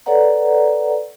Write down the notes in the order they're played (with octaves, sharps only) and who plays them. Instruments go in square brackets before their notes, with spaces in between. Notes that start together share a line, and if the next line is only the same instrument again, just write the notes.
[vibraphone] A4 B4 C#5 D5 F#5 A#5